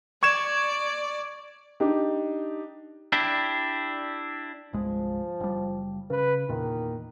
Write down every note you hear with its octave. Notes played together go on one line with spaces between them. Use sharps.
D5 C#6 G#6 E7
D4 D#4 G4
D4 E4 G4
G1 C2 F3 G#3
F#1 G3
C#3 B4
E2 A#2 D#3